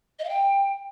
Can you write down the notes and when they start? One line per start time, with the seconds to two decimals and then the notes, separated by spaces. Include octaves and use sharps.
0.19 D#5
0.24 F5
0.29 G5